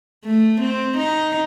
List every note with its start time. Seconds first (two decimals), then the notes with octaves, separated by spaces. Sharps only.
0.25 A3
0.61 C4
0.98 D#4